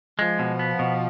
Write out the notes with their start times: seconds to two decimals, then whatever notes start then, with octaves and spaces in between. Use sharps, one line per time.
0.19 F3 G#3
0.39 B2
0.59 B3
0.79 B2